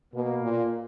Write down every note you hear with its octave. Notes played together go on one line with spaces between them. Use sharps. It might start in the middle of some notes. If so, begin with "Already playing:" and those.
B2 A#3
A#2